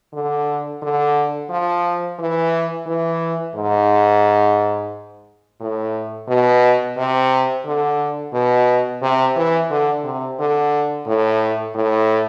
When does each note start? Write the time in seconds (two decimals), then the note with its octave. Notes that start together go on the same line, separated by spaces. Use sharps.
0.13 D3
0.82 D3
1.50 F3
2.19 E3
2.87 E3
3.55 G#2
5.61 A2
6.28 B2
6.97 C3
7.65 D3
8.33 B2
9.02 C3
9.36 E3
9.70 D3
10.05 C3
10.39 D3
11.06 A2
11.75 A2